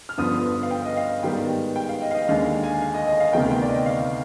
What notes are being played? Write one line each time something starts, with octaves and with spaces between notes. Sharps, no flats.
F6
G2 D3 F3 B3 D#6
F5
G5
D#5
F5
G#2 D#3 G3 B3 G5
G5
F5
D#5
F5
D#5
D#2 D3 G#3 F5
F5
G#5
F5
D#5
D#5
F5
D2 C3 D#3 B3 G5
G5
D5
D#5
F5